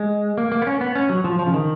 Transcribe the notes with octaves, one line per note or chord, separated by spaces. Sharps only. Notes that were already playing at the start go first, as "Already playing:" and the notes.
Already playing: G#3
A#3
A#3
B3
C#4
B3
C#4
F#3
F3
F3
C#3
D#3